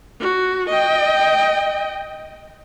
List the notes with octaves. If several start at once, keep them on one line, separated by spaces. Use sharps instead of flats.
F#4
D#5 G5